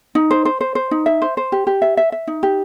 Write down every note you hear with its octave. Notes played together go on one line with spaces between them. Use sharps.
D#4
C5
C5
C5
C5
D#4
E5
C5
C5
G4
G4
E5
E5
E5
D#4
G4